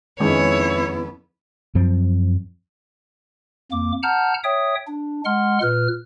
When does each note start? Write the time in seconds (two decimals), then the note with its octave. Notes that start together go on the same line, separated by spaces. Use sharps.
0.20 F2 D#3 G#3 B3 C#4 E4 C#5
1.75 F#2 F3 C4
3.72 F2 A#3 D6
4.03 F#5 A5 A#5 F6 G6
4.44 C#5 E5 G5 D#6
4.87 D4
5.25 G#3 F#5 C6 F6
5.62 A#2 B4 F6